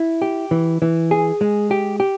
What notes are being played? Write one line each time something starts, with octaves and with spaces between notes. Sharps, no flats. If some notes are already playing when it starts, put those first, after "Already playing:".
Already playing: E4
G4
E3
E3
G#4
G#3
G4
G4